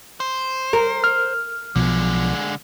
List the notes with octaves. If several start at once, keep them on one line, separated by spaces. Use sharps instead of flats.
C5
A#4
F6
B1 B2 D3 F3 G#3